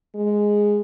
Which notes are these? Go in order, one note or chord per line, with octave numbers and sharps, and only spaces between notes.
G#3